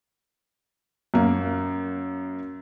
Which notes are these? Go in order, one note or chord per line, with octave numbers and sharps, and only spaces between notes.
F#2 A#3